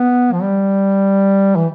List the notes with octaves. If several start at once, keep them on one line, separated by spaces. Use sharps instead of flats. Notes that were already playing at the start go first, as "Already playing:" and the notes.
Already playing: B3
F3
G3
E3